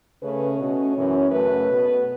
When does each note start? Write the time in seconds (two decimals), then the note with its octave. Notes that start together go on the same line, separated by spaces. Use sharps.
0.23 C#3 A3 C#4 B4
0.59 B2 A3 C#4
0.96 F#2 E3 C#4
1.31 F#2 C#3 A3 C#4 B4
1.68 B2 B3